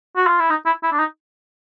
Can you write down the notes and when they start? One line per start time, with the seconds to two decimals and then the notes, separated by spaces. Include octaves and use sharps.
0.17 F#4
0.27 F4
0.39 E4
0.50 D#4
0.66 E4
0.83 E4
0.92 D4
0.99 D#4